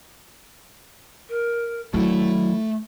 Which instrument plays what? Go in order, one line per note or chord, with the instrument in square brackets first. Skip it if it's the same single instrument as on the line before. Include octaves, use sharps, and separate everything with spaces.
[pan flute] A#4
[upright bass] D#3 F#3 [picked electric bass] A3 [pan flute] E4